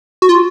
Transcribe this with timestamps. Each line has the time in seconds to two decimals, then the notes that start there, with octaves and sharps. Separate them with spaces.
0.22 F#4
0.29 F4